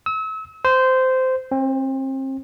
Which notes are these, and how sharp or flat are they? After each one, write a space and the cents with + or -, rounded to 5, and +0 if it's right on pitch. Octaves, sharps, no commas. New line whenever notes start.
E6 -35
C5 -15
C4 +35